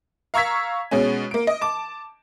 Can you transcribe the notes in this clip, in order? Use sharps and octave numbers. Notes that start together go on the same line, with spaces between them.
F5 A#5 C#6 E6 G#6 B6
B2 G#3 C#4
A#3 D7
D#5
A5 D6